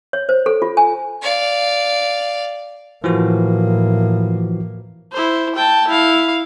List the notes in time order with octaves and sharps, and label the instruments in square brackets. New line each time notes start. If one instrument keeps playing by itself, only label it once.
[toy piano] C#5
C5
A4
F4
G#5
[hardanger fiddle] D5 F5
[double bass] A2 A#3 [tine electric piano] E3 F3 F#4
[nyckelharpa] E4 C5
G5 A5
E4 F5